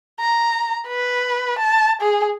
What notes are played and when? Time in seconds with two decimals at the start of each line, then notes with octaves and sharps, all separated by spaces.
0.20 A#5
0.88 B4
1.59 A5
2.01 G#4